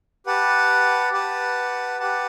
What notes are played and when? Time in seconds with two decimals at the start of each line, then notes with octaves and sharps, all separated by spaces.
0.26 G4 B4 F#5 A5
1.13 G4 B4 F#5 A5
1.99 G4 B4 F#5 A5